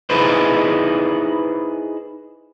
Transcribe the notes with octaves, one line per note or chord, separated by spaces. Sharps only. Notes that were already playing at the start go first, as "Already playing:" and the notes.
D#4 E4 G#4 B4 C5